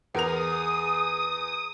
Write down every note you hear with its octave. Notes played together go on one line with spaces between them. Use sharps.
E2 G#4 A#4 D#6 F7